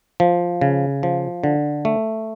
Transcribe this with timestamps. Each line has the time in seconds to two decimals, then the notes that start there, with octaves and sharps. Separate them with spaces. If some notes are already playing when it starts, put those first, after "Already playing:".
0.20 F3
0.61 C#3
1.03 F3
1.44 D3
1.85 A3